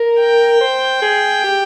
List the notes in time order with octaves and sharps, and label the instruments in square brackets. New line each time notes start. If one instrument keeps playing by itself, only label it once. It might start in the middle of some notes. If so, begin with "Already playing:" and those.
Already playing: [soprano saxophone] A#4
[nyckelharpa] G5
[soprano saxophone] C5
G#4
G4